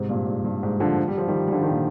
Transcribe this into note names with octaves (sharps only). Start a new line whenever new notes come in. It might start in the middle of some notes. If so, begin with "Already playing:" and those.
Already playing: G#2 C3
G2 A#2
G#2
G2
G#2
D3 F3
G3
F3
D#3 G3
G3
D3 F3
D#3
A#2 D3